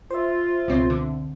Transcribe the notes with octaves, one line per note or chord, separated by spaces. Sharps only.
F4 C5 E5
C#2 B2 C4
D3